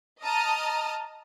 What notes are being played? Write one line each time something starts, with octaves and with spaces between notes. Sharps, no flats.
D#5 A5 A#5 D#6 F6